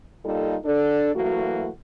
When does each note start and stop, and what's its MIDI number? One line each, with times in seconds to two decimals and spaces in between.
0.24 0.56 55
0.24 0.56 58
0.24 0.56 63
0.24 0.56 65
0.24 0.56 69
0.65 1.12 62
0.65 1.12 69
1.15 1.69 52
1.15 1.69 54
1.15 1.69 57
1.15 1.69 58
1.15 1.69 66